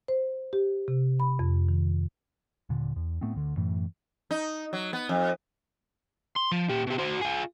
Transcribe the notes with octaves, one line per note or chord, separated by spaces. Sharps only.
C5
G4
C3
B5
F2
D#3
D#1 A#2 D3
E2
A2 A3 B3 C4
D2 D3
F#2 A2 E3 A3
D#4
F#3
B3
F2
C6
F3
A#2 G4
B2 G4
F#4 C5
F4 G#4